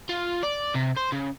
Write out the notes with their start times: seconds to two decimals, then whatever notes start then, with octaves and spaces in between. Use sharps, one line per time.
0.09 F4
0.43 D5
0.74 C3
0.97 C5
1.12 C#3